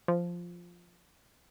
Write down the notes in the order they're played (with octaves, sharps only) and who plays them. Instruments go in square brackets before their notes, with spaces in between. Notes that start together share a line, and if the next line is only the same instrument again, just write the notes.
[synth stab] F3